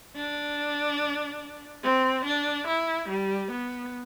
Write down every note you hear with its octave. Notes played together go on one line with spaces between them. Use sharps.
D4
C4
D4
E4
G3
B3